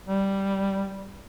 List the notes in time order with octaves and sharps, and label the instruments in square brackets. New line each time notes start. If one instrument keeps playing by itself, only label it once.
[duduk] G3